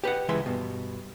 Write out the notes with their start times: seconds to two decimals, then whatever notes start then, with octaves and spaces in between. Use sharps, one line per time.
0.04 G4 B4 D#5 F#5
0.29 C#2 E3 G#3 B4 E5 C6
0.46 G2 B2